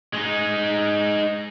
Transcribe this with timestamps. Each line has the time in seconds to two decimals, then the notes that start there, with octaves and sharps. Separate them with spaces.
0.13 G#3 D#4